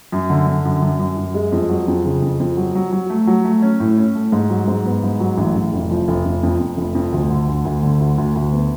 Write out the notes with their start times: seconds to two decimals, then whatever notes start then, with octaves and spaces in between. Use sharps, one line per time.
0.12 F#2
0.30 D3
0.47 D3
0.65 F#2
0.82 F#2
0.99 F#2
1.17 F#2
1.34 G#3
1.52 F2
1.69 F#3
1.88 F2
2.05 C#3
2.22 F2
2.40 F2
2.57 F#3
2.75 F#3
2.92 F#3
3.10 A3
3.27 F#3
3.45 A3
3.62 C#4
3.80 A2
3.98 C#4
4.15 A3
4.32 G#2
4.50 F#3
4.68 G#2
4.85 B3
5.03 G#2
5.20 F#3
5.37 A1
5.55 A1
5.73 F1
5.90 F3
6.08 F1
6.25 F1
6.43 F2
6.60 F2
6.77 F1
6.95 F2
7.12 D2
7.30 D3
7.48 D2
7.65 D2
7.83 D3
8.00 D2
8.18 D2
8.35 D2
8.52 B3